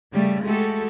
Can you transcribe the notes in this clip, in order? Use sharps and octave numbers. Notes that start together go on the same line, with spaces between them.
C#3 G3 A3
G#3 A3 F#4 G4 A4